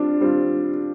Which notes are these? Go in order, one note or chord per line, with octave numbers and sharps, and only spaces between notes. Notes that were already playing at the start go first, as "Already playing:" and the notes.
Already playing: G3 C4 D4 F4
G3 C4 F4